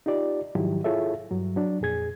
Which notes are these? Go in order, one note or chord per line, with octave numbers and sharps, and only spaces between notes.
D#4 F4 G4 D5
G#2 D#3 F3 F#3 E4 G4
E4 F4 G#4 A4 C#5 E5
G2 F#3
F#3 D4
F2 A#2 G#4 G#6